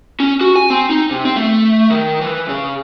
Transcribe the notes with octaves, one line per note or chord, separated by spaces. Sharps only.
C#4
F#4
G#5
C4
D#4
C3
C4
A3
D#3
E3
C#3